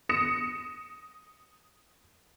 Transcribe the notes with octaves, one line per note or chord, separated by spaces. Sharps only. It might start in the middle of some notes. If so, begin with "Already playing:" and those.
D#6 A#6 C#7 E7